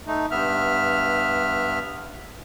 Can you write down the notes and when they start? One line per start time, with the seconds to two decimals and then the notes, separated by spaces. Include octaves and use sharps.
0.07 A3 D#4
0.31 G2 B3 E5 F6